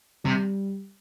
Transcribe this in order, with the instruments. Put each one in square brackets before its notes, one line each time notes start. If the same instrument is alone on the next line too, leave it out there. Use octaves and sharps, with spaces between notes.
[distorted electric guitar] C3 [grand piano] G3